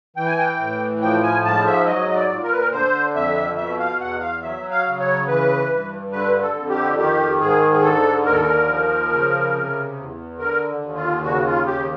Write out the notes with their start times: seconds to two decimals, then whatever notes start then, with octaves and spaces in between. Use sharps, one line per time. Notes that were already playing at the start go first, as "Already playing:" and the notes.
0.16 E3 G5
0.27 G#5
0.37 G5
0.59 A2
1.01 F3 G5
1.23 G#5
1.44 G#2 A5
1.66 E5
1.86 F#3 D#5
2.09 D#5
2.15 D5
2.30 A#2
2.43 A#4
2.51 B4
2.58 A#4
2.72 D3 C5
3.14 F2 E5
3.57 B2 E5
3.79 F5
3.99 E2 F#5
4.20 F5
4.42 F#3 E5
4.71 F5
4.86 C#3
5.00 C#5
5.28 E3 B4
5.70 G2
6.12 D3 B4
6.42 A4
6.56 F2
6.69 G4
6.98 D#3 G4
7.40 G#2 G#4
7.73 G#4
7.83 D3 A4
8.26 D#2 A#4
8.33 A4
8.41 A#4
8.68 F3
9.10 C#3
9.53 C3
9.96 E2
10.38 D3 A#4
10.81 D#2
10.95 F4
11.23 C#3 F#4
11.45 F4
11.66 D#2 G4